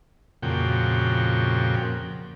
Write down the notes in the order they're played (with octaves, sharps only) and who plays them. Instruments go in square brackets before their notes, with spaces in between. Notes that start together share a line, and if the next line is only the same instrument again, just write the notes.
[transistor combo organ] F2 A#2 C#3 F#4 G5